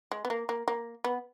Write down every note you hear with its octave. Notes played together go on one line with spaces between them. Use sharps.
G#3
B3
A#3
A#3
A#3
B3